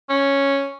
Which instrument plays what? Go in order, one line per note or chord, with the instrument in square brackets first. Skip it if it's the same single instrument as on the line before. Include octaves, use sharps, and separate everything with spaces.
[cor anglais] C#4